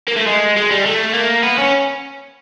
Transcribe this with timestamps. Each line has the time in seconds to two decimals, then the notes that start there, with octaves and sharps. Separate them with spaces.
0.08 A#3
0.17 A3
0.27 G#3
0.57 G#3
0.71 G3
0.86 A3
1.14 A#3
1.43 B3
1.58 C#4